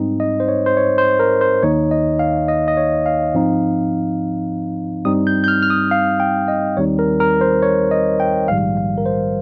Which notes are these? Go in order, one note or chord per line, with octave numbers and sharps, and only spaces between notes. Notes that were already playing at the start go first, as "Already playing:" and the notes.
Already playing: G#2 G3 C4 D#4
D#5
C5
C#5
C5
C#5
C5
A#4
C5
D#2 D#3 A#3 D#4 C#5
D#5
F5
D#5
D#5
C#5
F5
G#2 F3 C4 D#4
G2 G3 C4 D#4 D#6
G6
G6
F6
F6
D#6
F5
G5
D#5
D#2 D#3 G3 C4 D#4 C#5
A#4
A#4
C5
C#5
D#5
G5
A#1 G#2 D#3 G3 F5
F5
A#4
C5